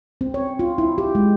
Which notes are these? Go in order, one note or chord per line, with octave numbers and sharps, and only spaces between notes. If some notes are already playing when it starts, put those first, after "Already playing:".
C4
C#5
F4
E4
G4
G#3